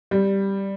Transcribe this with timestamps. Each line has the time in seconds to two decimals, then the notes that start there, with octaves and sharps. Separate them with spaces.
0.11 G3